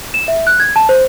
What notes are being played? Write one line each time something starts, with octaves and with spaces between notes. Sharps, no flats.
E7
E5
F#6
G#6
A5
C5